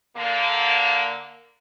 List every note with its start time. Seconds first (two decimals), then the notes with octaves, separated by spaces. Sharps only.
0.16 D3 A#3